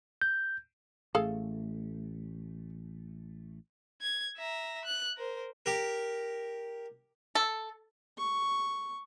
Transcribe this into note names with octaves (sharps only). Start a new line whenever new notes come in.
G6
A1 A3 G#4 A4 F5
G#6
E5 A#5
F#6
A#4 C5
G4 A#4
A4
C#6